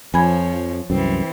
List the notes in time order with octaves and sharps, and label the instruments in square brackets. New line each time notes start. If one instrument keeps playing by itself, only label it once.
[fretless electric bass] F2 [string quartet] F3 C#5 [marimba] G#5 B5 G#6
[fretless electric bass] C2 F#2 [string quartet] E3 C4